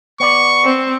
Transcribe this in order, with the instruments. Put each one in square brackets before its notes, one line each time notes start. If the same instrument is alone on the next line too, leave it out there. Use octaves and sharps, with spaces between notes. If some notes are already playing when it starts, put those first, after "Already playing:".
[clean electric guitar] B3 D5 [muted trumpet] C#6
[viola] C4